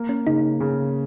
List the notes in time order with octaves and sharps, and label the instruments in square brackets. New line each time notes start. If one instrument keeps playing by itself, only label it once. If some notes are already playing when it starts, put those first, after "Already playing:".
Already playing: [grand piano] A#3
[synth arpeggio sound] C#4
[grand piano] C#3 [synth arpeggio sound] D#4
[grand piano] C#3